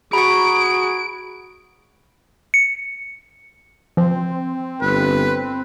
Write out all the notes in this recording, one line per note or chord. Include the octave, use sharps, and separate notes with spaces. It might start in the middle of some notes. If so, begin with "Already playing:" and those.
F#4 G#4 A#5 B5 C#6 D7
C#7
F3 C4
G1 B4